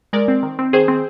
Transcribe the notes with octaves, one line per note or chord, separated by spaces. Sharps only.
G#3 A#4 D5
C4
D#3
C4
D#3 G#4 C5
C4